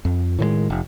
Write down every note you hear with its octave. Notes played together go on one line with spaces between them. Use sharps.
F2
A2 D#3 E3 G#3
F1